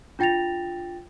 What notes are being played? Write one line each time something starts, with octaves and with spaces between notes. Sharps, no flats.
D4 F4 G5 A6 A#6 F7